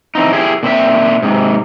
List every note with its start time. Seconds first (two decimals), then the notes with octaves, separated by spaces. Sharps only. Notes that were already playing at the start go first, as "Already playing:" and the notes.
0.15 E3 C4 D#4
0.33 E4 G4 G#4
0.63 A#2 C4 C5 E5
1.22 G#2 C3